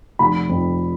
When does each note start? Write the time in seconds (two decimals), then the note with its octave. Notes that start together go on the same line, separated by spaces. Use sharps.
0.19 F1 B5
0.49 F2